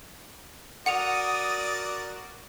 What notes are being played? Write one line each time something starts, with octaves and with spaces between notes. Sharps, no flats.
F#4 A#4 D5 F#5 D#6 C#7 F7